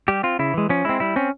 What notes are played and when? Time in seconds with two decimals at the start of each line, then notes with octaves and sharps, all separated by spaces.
0.08 G3 G4
0.23 C4 F4
0.39 C#3 E4
0.54 E3 G#3
0.69 F3 C#4
0.85 G#3 C4 E4
1.00 G3 E4
1.16 C4 C#4